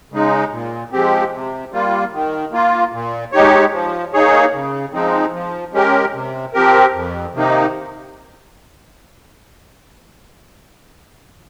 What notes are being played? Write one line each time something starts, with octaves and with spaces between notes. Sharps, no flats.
C#3 G#3 D#4
A#2
F3 G#3 C4 G4
C3
G3 A#3 F4
D#3
A#3 F4
A#2
G#3 D#4 G4 C#5
F3
A#3 D#4 G#4 C#5
C#3
F3 G#3 C4 D#4
F3
G#3 C#4 G4 A#4
C3
F3 C4 G4 A#4
F2
C3 D#3 A#3 D#4